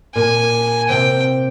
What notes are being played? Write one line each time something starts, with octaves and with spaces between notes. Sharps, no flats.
A#2 G#5
C3 G5